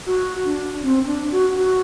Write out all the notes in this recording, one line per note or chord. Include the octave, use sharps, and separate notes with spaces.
F#4
D4
C4
D4
F#4
F#4